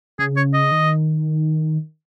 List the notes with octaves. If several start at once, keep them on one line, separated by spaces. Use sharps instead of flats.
C#3 G#4
C#5
D#5
D#3